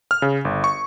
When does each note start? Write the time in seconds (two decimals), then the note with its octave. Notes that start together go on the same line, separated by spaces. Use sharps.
0.11 F6
0.22 C#3
0.45 G1
0.64 C#6